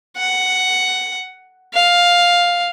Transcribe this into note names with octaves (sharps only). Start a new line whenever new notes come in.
F#5
F5